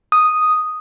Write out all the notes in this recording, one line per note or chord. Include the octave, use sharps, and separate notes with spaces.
D#6